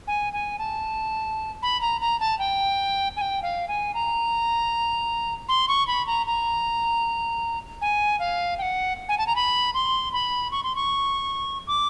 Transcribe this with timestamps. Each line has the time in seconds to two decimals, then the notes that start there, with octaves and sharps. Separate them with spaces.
0.07 G#5
0.33 G#5
0.59 A5
1.63 B5
1.81 A#5
2.01 A#5
2.20 A5
2.39 G5
3.17 G#5
3.21 G5
3.42 F5
3.68 G#5
3.94 A#5
5.49 C6
5.68 C#6
5.88 B5
6.07 A#5
6.26 A#5
7.81 G#5
8.19 F5
8.58 G5
8.62 F#5
9.09 G#5
9.18 A5
9.27 A#5
9.36 B5
9.74 C6
10.13 B5
10.52 C#6
10.64 C6
10.75 C#6
11.67 D6